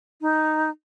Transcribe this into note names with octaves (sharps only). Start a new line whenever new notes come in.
D#4